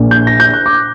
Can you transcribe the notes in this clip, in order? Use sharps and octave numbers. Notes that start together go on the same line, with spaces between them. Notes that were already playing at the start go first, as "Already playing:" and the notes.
Already playing: A#1 A#2
G6
A#6
G6
F#6
D6